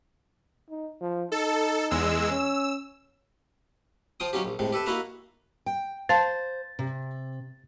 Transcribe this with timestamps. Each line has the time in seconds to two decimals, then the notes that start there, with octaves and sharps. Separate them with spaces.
0.70 D#4
1.01 F3
1.32 D#4 A4
1.90 E2 G#3 E6
2.31 C#4 E6
4.20 F3 F4 G5 D#6
4.33 F#3 C#4 D#4 F4 G4
4.45 A#1
4.59 A2 C3 G#3
4.72 G4 A4 B4 E5
4.86 A#3 D#4 E4 F#4 B4 F5
5.66 G5
6.09 C5 F5 A5 A6
6.79 C3